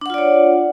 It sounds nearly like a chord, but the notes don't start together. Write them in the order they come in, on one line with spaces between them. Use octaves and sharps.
D4 F#5 F4 D5 C#5